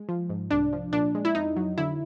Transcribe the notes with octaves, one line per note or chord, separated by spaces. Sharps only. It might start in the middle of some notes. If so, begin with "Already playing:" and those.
Already playing: G#3
F3
G#2
C2 D4
F3
A#2 D4
G#3
E4
F2 D#4
F#3
D3 E4